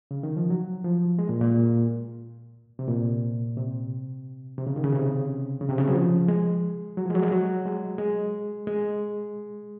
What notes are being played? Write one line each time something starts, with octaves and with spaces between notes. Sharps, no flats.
C#3
D#3
F3
F#3
F3
G#3
A#2
A#2
C3
A#2
C3
C3
C#3
D#3
C#3
C3
C#3
C3
C#3
F#3
F3
G#3
F#3
F3
G#3
F#3
G#3
F#3
G#3
G#3
G#3